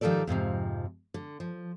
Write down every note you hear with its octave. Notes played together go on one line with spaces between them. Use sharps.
G#2 D#3 F3 G3 A4 D5
F2 G#2 C3 F3
D3
F3